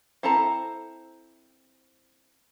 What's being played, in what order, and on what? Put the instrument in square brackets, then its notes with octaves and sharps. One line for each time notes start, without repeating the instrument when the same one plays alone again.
[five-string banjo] C4 E4 A4 A5 A#5